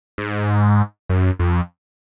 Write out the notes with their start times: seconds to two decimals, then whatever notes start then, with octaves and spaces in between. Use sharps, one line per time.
0.18 G#2
1.09 F#2
1.39 F2